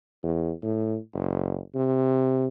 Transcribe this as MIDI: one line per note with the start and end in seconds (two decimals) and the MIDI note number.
0.23 0.51 40
0.62 0.98 45
1.14 1.58 30
1.75 2.47 48